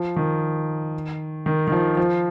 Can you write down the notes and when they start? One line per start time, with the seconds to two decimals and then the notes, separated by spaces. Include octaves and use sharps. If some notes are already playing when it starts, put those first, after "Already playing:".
Already playing: F3
0.16 D#3
1.46 D#3
1.67 D#3
1.72 F3
1.97 F3